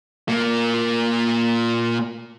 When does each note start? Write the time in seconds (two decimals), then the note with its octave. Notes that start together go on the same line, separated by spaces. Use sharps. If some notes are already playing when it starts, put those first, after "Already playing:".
0.28 A#2 A#3